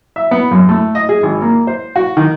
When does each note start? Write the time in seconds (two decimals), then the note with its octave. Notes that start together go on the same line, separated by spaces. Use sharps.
0.16 E5
0.31 B3
0.51 F#2
0.69 A3
0.95 D#5
1.09 G#4
1.23 G#1
1.42 A#3
1.67 C5
1.96 F#4
2.17 D#3